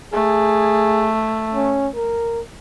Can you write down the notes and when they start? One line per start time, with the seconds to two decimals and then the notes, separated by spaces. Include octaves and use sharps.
0.13 A3 G#4
1.54 C#4
1.96 A#4